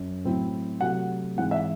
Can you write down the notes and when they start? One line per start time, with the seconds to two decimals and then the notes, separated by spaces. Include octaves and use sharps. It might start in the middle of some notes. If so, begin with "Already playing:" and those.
Already playing: F#2
0.25 A2 F#3 C4 E4
0.81 C3 F#3 A3 F#5
1.37 G#2 E3 C4 E4 F#5
1.51 E5